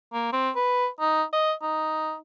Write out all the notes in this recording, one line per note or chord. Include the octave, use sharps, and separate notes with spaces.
A#3
C4
B4
D#4
D#5
D#4